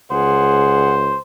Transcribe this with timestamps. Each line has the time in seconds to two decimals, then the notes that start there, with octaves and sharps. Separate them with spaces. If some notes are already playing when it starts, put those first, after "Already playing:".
0.11 C#2 G#4 C5 F#5